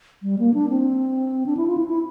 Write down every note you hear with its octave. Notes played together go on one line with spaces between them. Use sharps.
G3
A#3
D4
C4
D4
E4
F4
E4
E4